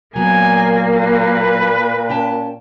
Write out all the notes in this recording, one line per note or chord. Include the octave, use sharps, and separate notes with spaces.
A#2 F#3 A#3 B3 G#5
B4
C#4 G5 A5